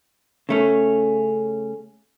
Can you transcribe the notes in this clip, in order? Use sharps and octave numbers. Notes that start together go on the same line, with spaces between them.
C#3 A3 C#4